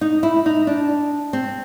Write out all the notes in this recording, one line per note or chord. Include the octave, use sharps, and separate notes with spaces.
D#4
E4
D#4
D4
C4